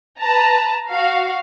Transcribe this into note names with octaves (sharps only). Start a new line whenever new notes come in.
B4 A5 A#5
F#4 F5